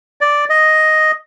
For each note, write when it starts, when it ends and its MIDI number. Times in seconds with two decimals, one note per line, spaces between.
0.21 0.45 74
0.50 1.12 75